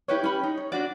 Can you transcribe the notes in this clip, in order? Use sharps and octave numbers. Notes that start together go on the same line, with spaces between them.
E4 G4 B4 C#5
C#4 G4 B5
D#4
C#5
D4 F#4 D5